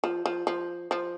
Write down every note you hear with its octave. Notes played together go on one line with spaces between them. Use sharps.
F3
F3
F3
F3